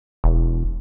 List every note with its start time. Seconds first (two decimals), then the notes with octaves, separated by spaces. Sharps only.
0.24 E1